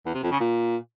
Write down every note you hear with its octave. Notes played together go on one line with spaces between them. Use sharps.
E2
C3
F2
C#3
A#2